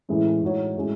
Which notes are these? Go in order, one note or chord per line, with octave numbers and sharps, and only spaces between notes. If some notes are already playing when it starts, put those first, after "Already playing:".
A2 E3 G#3 C#4
A2 G#3 D#4 F#4 C#5
A2 G#3 C#4